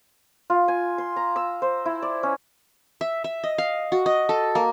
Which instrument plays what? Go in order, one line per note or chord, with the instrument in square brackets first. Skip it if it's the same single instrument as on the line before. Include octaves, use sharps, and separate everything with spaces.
[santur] F4
G#5
C6
A#5
E6
C5
E4
D5
C#4
[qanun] E5
E5
D#5
F5
F#4
D#5
A4
A#3